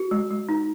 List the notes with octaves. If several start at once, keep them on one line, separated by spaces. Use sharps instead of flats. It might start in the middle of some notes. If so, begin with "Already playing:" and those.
Already playing: F#4
G#3
G#3
D#4